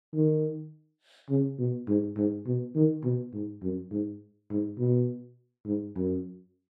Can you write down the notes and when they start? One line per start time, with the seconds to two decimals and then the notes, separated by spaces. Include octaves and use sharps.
0.13 D#3
1.29 C#3
1.59 B2
1.88 G#2
2.17 G#2
2.46 B2
2.75 D#3
3.04 B2
3.33 G#2
3.62 F#2
3.91 G#2
4.50 G#2
4.79 B2
5.66 G#2
5.95 F#2